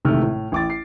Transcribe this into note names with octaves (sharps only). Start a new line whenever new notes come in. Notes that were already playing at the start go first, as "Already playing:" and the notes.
A1 G#2 C3 D#3 A3 F6
A2
A1 D6 A6
C7